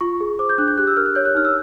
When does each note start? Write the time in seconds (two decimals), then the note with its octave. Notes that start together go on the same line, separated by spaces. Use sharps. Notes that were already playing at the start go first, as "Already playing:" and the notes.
0.01 F4 C#6
0.21 G#4
0.39 C5 D6
0.49 G6
0.58 D4 F#6
0.68 G6
0.78 G4 F#6
0.87 E6
0.97 A#4 F6
1.06 F#6
1.15 C#5 G6
1.25 F#6
1.35 D#4 F6
1.45 E6